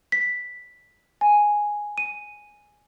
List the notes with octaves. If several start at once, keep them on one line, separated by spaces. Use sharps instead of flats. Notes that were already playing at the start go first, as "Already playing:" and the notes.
B6
G#5
D#7